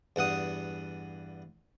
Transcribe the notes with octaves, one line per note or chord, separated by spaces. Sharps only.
E2 G2 F#5 D#6